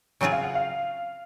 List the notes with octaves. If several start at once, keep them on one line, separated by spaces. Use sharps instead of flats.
C#3 F#3 C4 F4 G#4 C#5
F5
F#5
F5